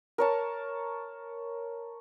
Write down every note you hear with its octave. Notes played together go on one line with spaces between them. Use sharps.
A#4 C#5 A5